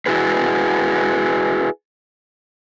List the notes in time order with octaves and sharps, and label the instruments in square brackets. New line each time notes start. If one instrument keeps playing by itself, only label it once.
[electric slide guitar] E4 F#4 G#4 B4